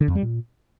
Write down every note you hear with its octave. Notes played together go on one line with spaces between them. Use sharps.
D3
F2
G3
A#2